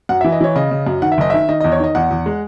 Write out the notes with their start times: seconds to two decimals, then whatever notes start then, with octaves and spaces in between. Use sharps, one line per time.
0.09 F#2 F#5
0.21 E3 E5
0.32 D#5
0.41 E3 C#5
0.56 C#3 D#5
0.71 C#3
0.87 F#2
1.02 D#3 F#5
1.12 E5
1.18 F#1 D#5
1.30 D#3 E5
1.49 D#3 D#5
1.60 E2 D#5
1.72 C#5
1.80 D#3 D#5
1.95 E2 F#5
2.11 E2
2.26 G#3